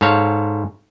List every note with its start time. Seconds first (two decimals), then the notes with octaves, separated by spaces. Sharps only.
0.01 G#2 A4 C#5 F5